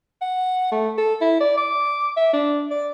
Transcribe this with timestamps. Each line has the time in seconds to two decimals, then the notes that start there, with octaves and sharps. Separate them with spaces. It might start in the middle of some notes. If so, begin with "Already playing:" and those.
0.21 F#5
0.72 A3
0.98 A4
1.21 E4
1.41 D5
1.57 D6
2.17 E5
2.33 D4
2.71 D5